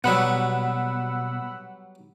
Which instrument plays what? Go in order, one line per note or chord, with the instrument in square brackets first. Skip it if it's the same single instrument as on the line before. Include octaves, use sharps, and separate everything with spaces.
[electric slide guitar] B2 [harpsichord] F#3 G3 B3 [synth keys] F#5 B5 E6